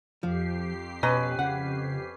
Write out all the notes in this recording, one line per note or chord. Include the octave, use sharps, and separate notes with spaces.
F2 F3 G4 C7
B2 C#4 B4 D#5 A#5
C#3 F#5